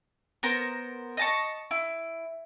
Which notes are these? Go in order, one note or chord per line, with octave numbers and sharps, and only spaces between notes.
B3 A#4 C5
D#5 A5 C#6
E4